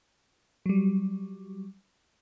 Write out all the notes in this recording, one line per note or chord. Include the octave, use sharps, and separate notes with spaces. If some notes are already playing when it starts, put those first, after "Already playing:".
F#3 G3